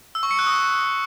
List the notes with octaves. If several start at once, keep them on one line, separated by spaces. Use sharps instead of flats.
E6
C#6
C#7
F#6
D#6